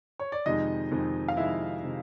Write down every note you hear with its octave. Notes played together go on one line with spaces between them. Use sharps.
C#5
D5
F2 C3 D#3 G#3 D#4 D#5
F2 C3 D#3 G#3
F5
F2 C3 D#3 G#3 E4 E5
C3 D#3 G#3